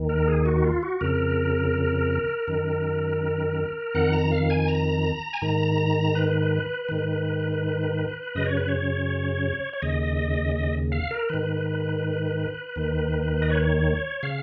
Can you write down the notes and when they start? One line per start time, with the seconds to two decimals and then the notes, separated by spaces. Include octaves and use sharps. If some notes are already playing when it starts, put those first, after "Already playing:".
Already playing: D#2 D#3
0.09 A#4
0.27 G#4
0.46 F#4
0.64 F4
0.83 F#4
1.01 F2 C#3 A#4
2.47 F#2 D#3
3.95 F2 D#3 F#5
4.13 A#5
4.32 F5
4.50 G#5
4.68 A#5
5.33 G#5
5.42 G#2 D#3 A#5
6.15 B4
6.89 G#2 D#3
8.35 F#2 C#3 D#5
8.46 C#5
8.57 B4
8.68 C#5
9.73 C#5
9.82 D#2 C#3 D#5
10.56 D#5
10.92 F5
11.11 A#4
11.29 G#2 D#3 B4
12.76 D#2 D#3
13.42 D#5
13.49 C#5
14.23 C#3 F5